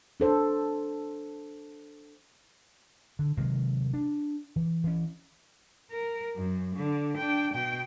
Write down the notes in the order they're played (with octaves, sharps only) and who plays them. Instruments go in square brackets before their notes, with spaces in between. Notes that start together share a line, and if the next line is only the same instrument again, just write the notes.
[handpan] D4 A4 C5
[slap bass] D3
C3 D#3 F#3 G#3
D4
E3
E3 C#4
[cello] A#4
F#2
D3
D4 G5
B2 G5